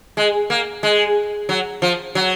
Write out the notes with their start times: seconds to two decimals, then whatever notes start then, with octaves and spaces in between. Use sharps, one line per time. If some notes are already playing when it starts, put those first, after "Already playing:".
0.17 G#3
0.50 A#3
0.83 G#3
1.49 F#3
1.82 F3
2.15 F#3